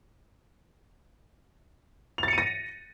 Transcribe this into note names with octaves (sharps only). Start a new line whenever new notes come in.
A6 A#6 C#7 D#7 F7